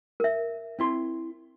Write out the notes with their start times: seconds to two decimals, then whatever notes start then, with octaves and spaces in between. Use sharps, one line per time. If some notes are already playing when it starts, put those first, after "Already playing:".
0.20 A#4 E5
0.79 C4 E4 C6